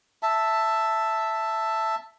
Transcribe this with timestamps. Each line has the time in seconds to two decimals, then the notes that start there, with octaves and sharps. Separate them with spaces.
0.23 E5 A5